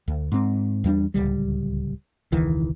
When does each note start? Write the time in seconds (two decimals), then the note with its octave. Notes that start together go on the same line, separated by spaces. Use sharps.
0.08 D2
0.32 G#2 C4
0.84 E2 G3 C4 D4
1.14 D1 G#1 C#2 G3
2.32 E1 C#2 D#3 E3